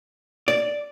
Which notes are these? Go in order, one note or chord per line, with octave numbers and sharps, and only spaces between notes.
D5